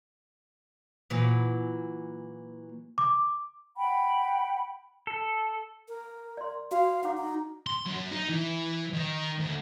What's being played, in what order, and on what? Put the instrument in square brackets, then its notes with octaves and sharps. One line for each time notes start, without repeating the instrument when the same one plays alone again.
[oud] A#2 E3 F#3
[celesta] D6
[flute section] F#5 G5 B5
[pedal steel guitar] A4
[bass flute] A#4
[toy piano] D5 C6
[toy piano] F#4 [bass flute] F5
[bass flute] D#4 [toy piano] F#5 D6
[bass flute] D#4
[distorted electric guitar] C6
F#2
D#4
E3
D#3
D2